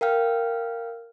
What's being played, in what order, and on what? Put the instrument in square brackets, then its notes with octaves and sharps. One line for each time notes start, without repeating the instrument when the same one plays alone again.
[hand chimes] A#4 F5 G5 F6